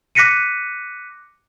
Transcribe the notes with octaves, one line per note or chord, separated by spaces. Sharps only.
D6 F#6 A#6 B6 C#7 D#7